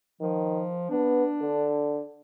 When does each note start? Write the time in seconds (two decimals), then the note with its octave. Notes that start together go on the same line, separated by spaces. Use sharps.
0.21 D#3 F3
0.90 B3 D4
1.42 D3